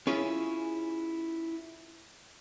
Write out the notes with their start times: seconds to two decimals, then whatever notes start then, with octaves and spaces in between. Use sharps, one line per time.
0.07 C#4 E4 F4 G#4